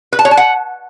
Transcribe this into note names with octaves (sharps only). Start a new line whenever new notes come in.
B4
A5
C#5
A5
F#5